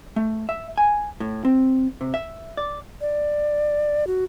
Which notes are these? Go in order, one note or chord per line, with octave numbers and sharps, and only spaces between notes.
A3
E5
G#5
A2
C4
C3
E5
D5
D5
F#4